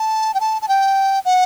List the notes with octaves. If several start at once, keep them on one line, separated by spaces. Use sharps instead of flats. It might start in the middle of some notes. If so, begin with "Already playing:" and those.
Already playing: A5
G5
A5
A5
G5
F#5